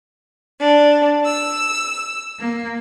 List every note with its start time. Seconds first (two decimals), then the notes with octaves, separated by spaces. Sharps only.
0.60 D4
1.25 E6
2.39 A#3